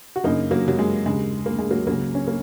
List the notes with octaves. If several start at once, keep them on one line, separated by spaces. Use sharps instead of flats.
F#4
F#2 C#3 A#3 D#4
F#3 A#3
F#3
G#3
D#2 C#3 G#3
A#3
G#3
F#3 A#3
C#2 C#3 F#3 A#3
C#4
A#3